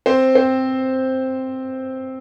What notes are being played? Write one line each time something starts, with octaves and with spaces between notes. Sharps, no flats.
C4 C5
C4 C5